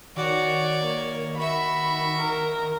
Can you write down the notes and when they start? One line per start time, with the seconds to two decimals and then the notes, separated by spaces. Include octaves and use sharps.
0.16 D#3 F#4 C#5 D5
0.81 A#3
1.38 F#4 E5 B5
2.18 A#4